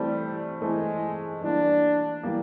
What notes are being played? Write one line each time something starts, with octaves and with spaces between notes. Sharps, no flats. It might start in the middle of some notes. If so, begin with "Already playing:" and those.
Already playing: E3 G3 A3 C4
E3 G#3 A3 C4
E3 G3 A#3 D4
E3 G3 A#3